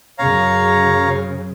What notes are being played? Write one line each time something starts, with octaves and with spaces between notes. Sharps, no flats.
F#2 C#3 C#5 F5 A#5